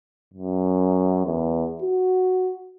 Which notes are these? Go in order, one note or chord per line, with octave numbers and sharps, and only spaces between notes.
F#2
E2
F#4